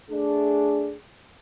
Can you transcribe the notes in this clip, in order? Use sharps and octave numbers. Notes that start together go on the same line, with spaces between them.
A3 D4 G#4